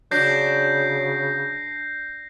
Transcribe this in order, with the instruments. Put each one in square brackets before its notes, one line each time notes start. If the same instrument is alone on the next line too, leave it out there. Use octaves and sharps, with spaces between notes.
[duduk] C#3 [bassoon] F#3 [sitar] D4 [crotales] G6 A#6 C7